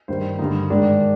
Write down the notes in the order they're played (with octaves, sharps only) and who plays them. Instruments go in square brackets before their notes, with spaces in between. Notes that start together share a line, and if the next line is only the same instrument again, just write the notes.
[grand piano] G2 D#3 C5
G2 D3 D#4
G#2 D#3 D4